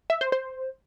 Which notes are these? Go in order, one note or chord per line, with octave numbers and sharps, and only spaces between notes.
E5
C5
C5